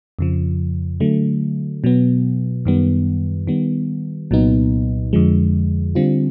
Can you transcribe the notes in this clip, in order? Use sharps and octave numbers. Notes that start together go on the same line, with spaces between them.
F2 C#3 F3
D3 F#3 A3
B2 F#3 B3
F#2 D#3 G3 B3
D#3 G3 B3
C2 A#2 F#3 B3 D#4
F2 D3 F3 G#3
D3 G3 C4 F4